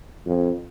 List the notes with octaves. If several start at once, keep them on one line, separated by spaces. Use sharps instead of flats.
F2